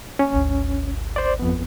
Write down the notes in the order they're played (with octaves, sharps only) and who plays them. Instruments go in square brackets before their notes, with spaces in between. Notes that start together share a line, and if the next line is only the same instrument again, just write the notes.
[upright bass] A#3 [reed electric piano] C#4
[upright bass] G#1 D2
[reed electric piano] C5 D5
F2 B3